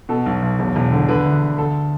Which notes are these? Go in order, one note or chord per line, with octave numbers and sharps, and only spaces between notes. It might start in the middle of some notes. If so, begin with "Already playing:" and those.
B2 A4
B1
B1
E1
E1
D3
D3 B4
D2
D2
D2 A4